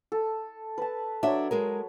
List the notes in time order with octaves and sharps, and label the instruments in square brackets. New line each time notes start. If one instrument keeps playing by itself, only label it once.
[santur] A4
B4 A5
[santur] F#3 C#5 [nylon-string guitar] D4 E5
[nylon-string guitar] G#3 G#4 A#4